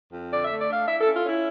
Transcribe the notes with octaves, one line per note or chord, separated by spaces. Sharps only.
F2
D3 D5
E5
A3
D5
D4
F5
E4 E5
A4
C#4
F4
C#4
E4